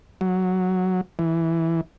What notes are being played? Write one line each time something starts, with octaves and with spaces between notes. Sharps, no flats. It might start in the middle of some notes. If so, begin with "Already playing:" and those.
F#3
E3